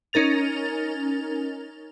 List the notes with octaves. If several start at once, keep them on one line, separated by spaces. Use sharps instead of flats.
C#4 D#4 A#4 A6 F7